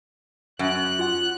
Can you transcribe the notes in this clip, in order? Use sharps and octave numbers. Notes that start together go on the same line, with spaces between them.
F#2 F#6 D7
F4 F#5